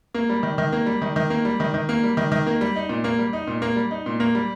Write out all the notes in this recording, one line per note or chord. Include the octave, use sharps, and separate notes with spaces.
A#3
G3
D#3
D#3
A#3
G3
D#3
D#3
A#3
G3
D#3
D#3
A#3
G3
D#3
D#3
A#3
G3
D#4
A#2
A#3
G3
D#4
A#2
A#3
G3
D#4
A#2
A#3
G3